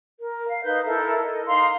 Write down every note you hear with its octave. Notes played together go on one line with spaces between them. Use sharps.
A#4
F5
D#4 B4 G6
E4 A4 A#4 E5
D#5
D#4 F5 A#5 C6